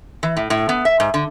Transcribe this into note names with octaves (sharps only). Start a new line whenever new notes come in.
E3
A2
A2
B3
E5
G#2
D3